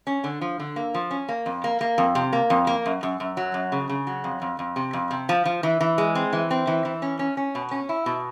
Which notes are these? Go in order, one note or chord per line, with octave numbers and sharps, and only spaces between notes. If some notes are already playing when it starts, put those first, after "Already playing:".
C#4
D3
F3
D3
A#3
F3
C#4
A#3
F2
A#3
A#3
F2
C3
A#3
F2
A#3
F#2
F#2
F#2
F#3
F#2
C#3
C#3
F#3
F2
F2
F2
C3
F2
C3
F3
F3
E3
E3
G#3
C4
E3
C4
E3
E3
C#4
C#4
C#4
B2
C#4
E4
B2